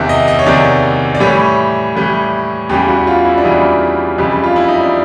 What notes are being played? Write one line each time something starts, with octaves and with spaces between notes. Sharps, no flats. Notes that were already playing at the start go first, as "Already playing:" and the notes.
Already playing: E2 C3 D#3 E5
D#5
D#5
C#5
E2 C3 D#3 D5
D5
A2 E3 G3 C#5
A2 E3 G3
E2 C#3 E3 G3 G4
F#4
F4
E4
D4
E2 C#3 E3 G3 D#4
F2 C#3 E3 G3
F4
E4
D#4
D4